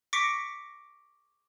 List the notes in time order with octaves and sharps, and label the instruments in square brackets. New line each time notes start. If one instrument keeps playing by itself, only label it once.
[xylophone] C#6 D6 A#6 B6 C#7 D7